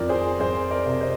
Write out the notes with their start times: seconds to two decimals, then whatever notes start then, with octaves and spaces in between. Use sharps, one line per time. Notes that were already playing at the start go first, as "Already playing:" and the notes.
Already playing: F2 D#3 A#4 D5
0.09 G#4 C5
0.40 F2 G#4 C5
0.71 A#4 D5
0.85 C3
1.01 C5 D#5